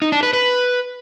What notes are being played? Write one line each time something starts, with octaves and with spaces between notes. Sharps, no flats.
D#4
D4
B4
B4